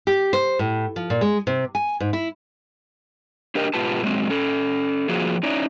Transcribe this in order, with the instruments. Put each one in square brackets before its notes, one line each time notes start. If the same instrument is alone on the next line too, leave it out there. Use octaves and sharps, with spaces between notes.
[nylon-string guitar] G4
C5
A2
F3
A#2
G#3
C3
G#5
G#2
E4
[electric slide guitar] D4 G4 A#4 D#5
G#2 B2 F4 G4 B4 A5
A#2 F3 F#3 G#3 C4
C#4 A4
F3 A#3 F4 F#4 G#4
C#4 D#4 E4 D5